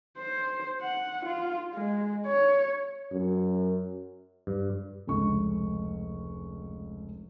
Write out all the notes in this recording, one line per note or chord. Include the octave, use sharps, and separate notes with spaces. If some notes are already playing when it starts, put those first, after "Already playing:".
C5
F#5
F4
G#3
C#5
F#2
G2
F1 C#2 C#6